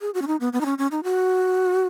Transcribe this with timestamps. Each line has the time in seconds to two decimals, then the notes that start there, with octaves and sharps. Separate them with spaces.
0.01 G#4
0.14 F#4
0.22 C#4
0.27 D#4
0.40 B3
0.53 B3
0.61 D#4
0.66 C#4
0.78 C#4
0.91 D#4
1.04 F#4